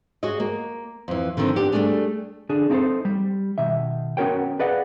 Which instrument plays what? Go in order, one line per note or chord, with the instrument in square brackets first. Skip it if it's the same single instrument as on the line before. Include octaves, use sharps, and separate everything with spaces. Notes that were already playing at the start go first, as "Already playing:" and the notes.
[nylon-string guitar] F#4 G#4 C#5 D#5
A#3
F2 E3
D3 D#3 F3 C4 D4
B3 D4 G4
G3 A3 A#3 D4 G#4
[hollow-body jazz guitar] D3 D4 G#4
C4 D#4 E4 A4 C5
G3
B2 D#3 E5
B3 C#4 F#4 A#4 C#5 G5
G#4 B4 D5 D#5 F5 F#5